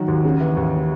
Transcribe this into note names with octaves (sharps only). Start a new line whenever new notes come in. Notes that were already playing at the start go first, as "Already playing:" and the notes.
Already playing: D#3 F#3 F#4
D#2
C#3
E3
D#2